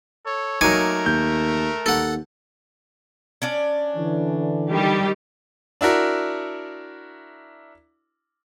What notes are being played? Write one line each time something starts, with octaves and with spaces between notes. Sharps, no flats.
A4 C#5
F#3 A3 A#3 D#4 A#4 G#5 C#6 D6
D#2 G6
D#2 A4 F#5
C#4 D4 D5
D3 E3
D#3 G3 G4
D4 E4 F#4 A#4